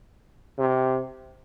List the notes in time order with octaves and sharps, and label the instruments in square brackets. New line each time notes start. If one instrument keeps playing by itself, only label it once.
[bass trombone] C3